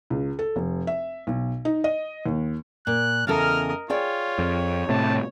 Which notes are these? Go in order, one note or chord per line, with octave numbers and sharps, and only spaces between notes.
C#2
A4
F1
E5
B1
D#4
D#5
D#2
A#2 F#6
E2 C#3 A4 A#4 D#5 F6
F4 G#4 C#5 D5 G5
F2
A2 C3 A5